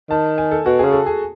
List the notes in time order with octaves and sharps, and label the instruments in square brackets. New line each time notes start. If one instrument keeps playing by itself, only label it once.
[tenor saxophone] D#3 [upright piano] A5
[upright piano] G#5
A4
[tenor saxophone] B2 [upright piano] F#4
[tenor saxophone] C#3 [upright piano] G#4
[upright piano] A4
G#4